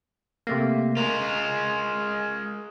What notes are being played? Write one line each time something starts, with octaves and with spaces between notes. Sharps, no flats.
C3 A3 A#3
G#3 F4 A#4